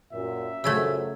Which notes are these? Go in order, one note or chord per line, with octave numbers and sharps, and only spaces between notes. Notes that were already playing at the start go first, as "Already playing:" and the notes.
F#2 A#2 E5
F#2 C#3 F3 F#3 A3 E6 G#6